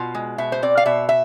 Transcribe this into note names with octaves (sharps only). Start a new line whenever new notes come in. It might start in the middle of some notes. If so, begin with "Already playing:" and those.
Already playing: B2 F4
G#3
B2 E5
C5
C4 D5
F5
B2 E5
E5